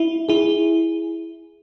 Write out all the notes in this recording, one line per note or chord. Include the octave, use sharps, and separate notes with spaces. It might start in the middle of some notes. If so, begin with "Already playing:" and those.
Already playing: E4
E4 G#4